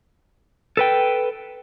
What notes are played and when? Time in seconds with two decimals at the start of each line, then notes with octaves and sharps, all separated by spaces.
0.77 A4 B4 G5